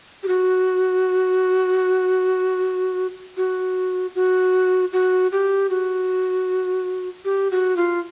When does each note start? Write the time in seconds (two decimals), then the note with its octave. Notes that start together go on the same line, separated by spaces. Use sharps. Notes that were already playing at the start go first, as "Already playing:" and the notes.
0.23 G4
0.28 F#4
3.37 F#4
4.15 F#4
4.93 F#4
5.32 G4
5.70 F#4
7.25 G4
7.51 F#4
7.77 F4